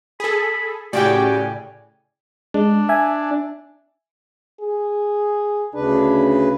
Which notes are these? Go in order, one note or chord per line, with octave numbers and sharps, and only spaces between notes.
G#4 A4 B5
A2 C#3 F#4 G4 D5 G5 G#5
G#3 D4
E5 G#5
G#4
D2 C#3 D4 B4